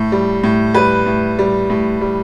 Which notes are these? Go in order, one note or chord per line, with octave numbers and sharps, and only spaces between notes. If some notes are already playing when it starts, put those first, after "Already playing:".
Already playing: A2
G3
A2
G3 B4
A2
G3
A2
G3